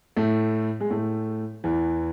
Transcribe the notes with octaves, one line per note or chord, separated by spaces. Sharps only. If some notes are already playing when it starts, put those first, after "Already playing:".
A2 A3
G#3
A2 A3
E2 E3